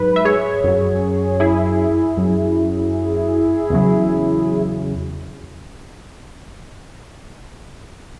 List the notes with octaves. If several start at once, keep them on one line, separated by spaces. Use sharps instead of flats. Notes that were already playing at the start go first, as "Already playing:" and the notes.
Already playing: G#2 F#3 B4
E5
G#4 C#5
F#2 F#3
E4 G#4
F#2 F#3
E2 C#3 F#3